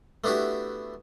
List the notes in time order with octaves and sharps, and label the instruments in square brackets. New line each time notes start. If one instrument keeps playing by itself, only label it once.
[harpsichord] A3 B3 D4 E4 F#4 G4